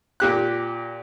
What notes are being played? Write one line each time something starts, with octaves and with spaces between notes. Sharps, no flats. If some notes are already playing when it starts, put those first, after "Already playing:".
A#2 G4 F#6